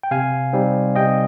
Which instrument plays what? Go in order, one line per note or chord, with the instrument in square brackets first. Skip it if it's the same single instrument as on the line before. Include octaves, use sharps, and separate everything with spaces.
[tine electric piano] G5
C3 F5 G#5
G3 C4 D#4
C3 D#5 G5